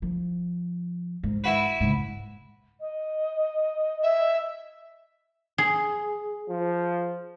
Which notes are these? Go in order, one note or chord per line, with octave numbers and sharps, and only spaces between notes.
F3
G#2
E4 F#4 B4
G#2 C#3
D#5
E5
G#4
F3